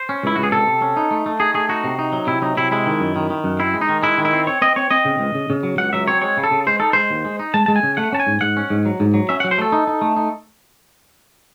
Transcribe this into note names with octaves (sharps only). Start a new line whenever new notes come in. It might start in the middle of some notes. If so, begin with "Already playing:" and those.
Already playing: C5
C#4
C#2 E4
C#2 F#4
G#4
C3 A4
C3
C#4
D#4
A3
A3
D#4 G#4
A3 G#4
D#4 F#4
C3
D#4
F#3
C3 E4
F#3 D#4
C3 E4
G#3 E4
D#3
F#2
D#3
D#3
F#2
C4 E4
G#3
D#4
D#3
G#3 E4
D#3
E4
C4
C4 C#5
C4 D#5
C4 C#5
C4 D#5
C#3
C#2
C#3
C#3
F#3
C#2 F#5
F#3 E5
C4 C#5
G#3 C#5
C#3
A4
C#3
G#3 C5
D#4 A4
G#3 C5
D#2
G#3
D#4
G#3 A5
G#3 A5
G#5
C#3
A3 F#5
C#4 A5
G#5
G#2
G#2 F#5
C#4
G#2
F#3
G#2
F#3
C#4 E5
F#5
F#3
C5
A3 A4
D#4
D#4
A3
D#4